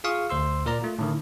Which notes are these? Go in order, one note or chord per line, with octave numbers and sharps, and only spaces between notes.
F4 G#4 F5 C#6 D#6
D2 C5 C6 E6
A#2 A#4 D5 A#5
A3 F4
A2 D3 D#3